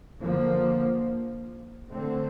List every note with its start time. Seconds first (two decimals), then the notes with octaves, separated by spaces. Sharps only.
0.20 D3 F3 A#3
1.90 D3 A3 C4